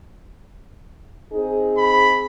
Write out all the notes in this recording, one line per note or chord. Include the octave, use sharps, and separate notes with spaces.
C4 D#4 G#4
B5